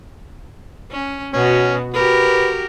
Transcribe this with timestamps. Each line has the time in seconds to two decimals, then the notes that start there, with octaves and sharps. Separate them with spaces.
0.91 C#4
1.34 B2 B3 C#4 F#4
1.94 F#4 G4 A#4 B4